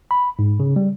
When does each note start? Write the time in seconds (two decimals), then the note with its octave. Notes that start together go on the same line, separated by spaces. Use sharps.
0.11 B5
0.39 G#2
0.60 C#3
0.76 G3